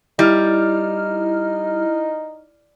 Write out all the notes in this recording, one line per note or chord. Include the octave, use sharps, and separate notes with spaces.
G3 D#4 E4 F6